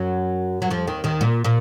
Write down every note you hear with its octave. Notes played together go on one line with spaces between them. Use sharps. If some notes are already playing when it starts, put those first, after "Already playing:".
Already playing: F#2 F#3
F#3
F2 F3
D#2 D#3
D#2 D#3
A#2 A#3
A#2 A#3